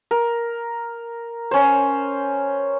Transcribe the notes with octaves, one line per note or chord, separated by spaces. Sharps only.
A#4
C#4 C5